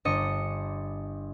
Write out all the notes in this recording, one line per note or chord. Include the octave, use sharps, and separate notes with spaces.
G1 D4 D#5 C#7